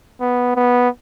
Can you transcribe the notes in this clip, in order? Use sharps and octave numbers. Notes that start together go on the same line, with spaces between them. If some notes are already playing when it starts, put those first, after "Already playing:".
B3
B3